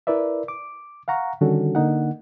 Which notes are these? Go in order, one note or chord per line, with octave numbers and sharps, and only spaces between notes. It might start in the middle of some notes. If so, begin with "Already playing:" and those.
E4 A#4 B4 D5 E5
D6
F5 F#5 A#5 C#6
D3 D#3 G3 C#4 F#4 A4
D3 A#3 D#4 F#5